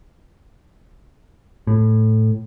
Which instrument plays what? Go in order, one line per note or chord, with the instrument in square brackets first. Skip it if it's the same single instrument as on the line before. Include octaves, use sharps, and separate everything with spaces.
[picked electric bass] A2